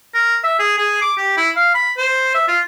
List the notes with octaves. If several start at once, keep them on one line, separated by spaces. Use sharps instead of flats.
A#4
E5
G#4
G#4
D6
G4
E4
F5
B5
C5
E5
F4